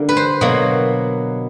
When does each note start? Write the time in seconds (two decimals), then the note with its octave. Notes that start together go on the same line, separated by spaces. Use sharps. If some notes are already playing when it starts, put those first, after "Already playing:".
Already playing: D3 G3 A#3
0.09 B4
0.17 C5
0.41 B2 F#3 A#3